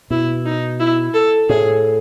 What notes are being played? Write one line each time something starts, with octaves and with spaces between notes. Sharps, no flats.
B2 E4
D#4
E4
A4
A2 G#4